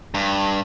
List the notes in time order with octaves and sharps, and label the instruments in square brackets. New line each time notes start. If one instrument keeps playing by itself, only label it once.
[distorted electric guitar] G2